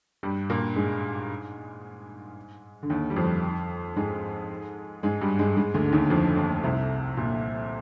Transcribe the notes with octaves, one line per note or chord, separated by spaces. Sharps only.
G2 G3
A#2 A#3
G#2 G#3
D3
D#2 D#3
G3
F2 F3
G#2 G#3
G#2 G#3
G2 G3
G#2 G#3
G#2 G#3
D2 D3
D3
D#2 D#3
F2 F3
D#2 D#3
C2 C3
A#2